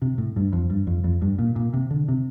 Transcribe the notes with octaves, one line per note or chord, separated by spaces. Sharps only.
C3
A2
G2
F2
G2
F2
F2
G2
A#2
A#2
C3
D3
C3